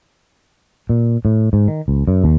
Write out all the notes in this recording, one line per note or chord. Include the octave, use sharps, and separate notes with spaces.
A#2
A2
G#2
D#3
C#2
F#2
D#2